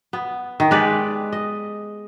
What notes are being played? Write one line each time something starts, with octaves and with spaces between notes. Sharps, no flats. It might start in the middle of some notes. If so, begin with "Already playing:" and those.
B3
D#3
G#3 G4 B4 D5
D#5